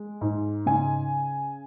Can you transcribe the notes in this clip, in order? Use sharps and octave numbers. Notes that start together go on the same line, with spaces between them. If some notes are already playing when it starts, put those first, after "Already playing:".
Already playing: G#3
G#2
C#3 G#5